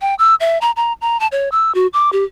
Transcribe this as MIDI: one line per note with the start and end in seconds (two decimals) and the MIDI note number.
0.01 0.15 79
0.19 0.35 88
0.40 0.58 76
0.61 0.71 82
0.76 0.93 82
1.01 1.20 82
1.20 1.27 81
1.32 1.49 73
1.52 1.72 88
1.75 1.87 66
1.93 2.10 86
2.13 2.24 67